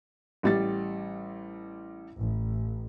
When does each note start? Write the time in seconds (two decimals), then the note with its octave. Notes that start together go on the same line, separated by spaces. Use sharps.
0.43 A1 G3 A6
2.16 A1